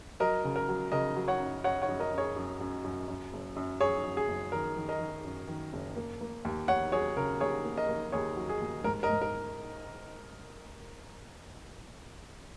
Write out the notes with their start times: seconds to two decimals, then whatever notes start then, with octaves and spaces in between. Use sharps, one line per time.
0.20 F#3 A#4 D#5
0.45 C#3
0.56 A#4
0.69 F#3
0.92 C#3 A#4 D#5
1.16 F#3
1.28 C#5 F#5
1.40 F#2
1.64 F#2 C#5 F#5
1.82 C#5 F#5
1.89 F#2
2.00 A#4 D#5
2.12 F#2
2.18 G#4 C#5
2.36 F#2
2.61 F#2
2.85 F#2
3.08 F#2
3.33 F#1
3.56 F#2
3.80 F#2 G#4 C#5
4.04 F#2
4.17 G#4
4.28 F#1
4.52 D#3 A#4
4.77 D#3
4.89 A#4 D#5
5.01 D#3
5.24 F#2
5.48 D#3
5.73 F#1
5.96 A#3
6.21 A#3
6.45 D#2
6.68 D#2 C#5 F#5
6.92 F#3 G#4 C#5
7.17 C#3 A#4
7.40 D#2 G#4 C#5
7.64 A#3
7.77 A#4 D#5
7.89 A#3
8.12 D#2 G#4 C#5
8.37 F#3
8.49 G#4
8.61 D#2
8.84 G#2 A#4
9.03 A#4 D#5
9.10 G#2
9.22 A#4